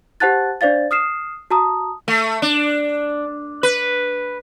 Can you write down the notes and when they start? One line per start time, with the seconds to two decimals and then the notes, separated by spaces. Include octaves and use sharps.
0.20 G4 C5 F#5 A5 F#6 A6
0.61 D4 C5 D5 F5 A6
0.91 D#6 F6 C7 E7
1.50 F#4 A5 A#5 D#6
2.08 A3
2.42 D4
3.63 B4